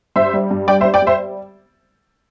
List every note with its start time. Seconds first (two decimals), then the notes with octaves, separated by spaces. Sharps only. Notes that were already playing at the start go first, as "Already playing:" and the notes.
0.16 G2 C5 E5
0.34 G3
0.51 G2
0.68 G3 D5 G5
0.81 C5 E5
0.85 G3
0.94 D5 G5
1.02 G3 C5 E5